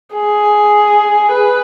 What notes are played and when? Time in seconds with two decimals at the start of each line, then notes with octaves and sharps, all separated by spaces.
0.15 G#4
1.33 B4